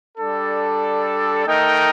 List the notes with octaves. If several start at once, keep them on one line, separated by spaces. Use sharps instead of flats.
G3 D4 A4
A3 D#4 A#4 D#5 G5